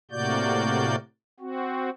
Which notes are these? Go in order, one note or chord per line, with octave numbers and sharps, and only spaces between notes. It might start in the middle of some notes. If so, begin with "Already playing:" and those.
A2 C3 A#3 F#4 D5 G6
C4 F#4